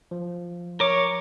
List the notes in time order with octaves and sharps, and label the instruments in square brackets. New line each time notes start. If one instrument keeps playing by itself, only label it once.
[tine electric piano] F3
[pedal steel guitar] A#4 D6 [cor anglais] C#5